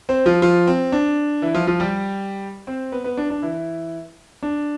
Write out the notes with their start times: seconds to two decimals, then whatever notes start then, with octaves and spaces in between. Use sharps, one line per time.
0.09 C4 C5
0.26 F3 F4
0.42 F3 F4
0.67 C4
0.92 D4
1.42 E3 E4
1.55 F3 F4
1.67 F3 F4
1.80 G3 G4
2.67 C4 C5
2.92 B3 B4
3.04 B3 B4
3.17 D4
3.30 D4
3.42 E3 E4
4.43 D4